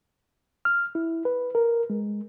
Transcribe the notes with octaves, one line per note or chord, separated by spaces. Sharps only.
F6
E4
B4
A#4
G#3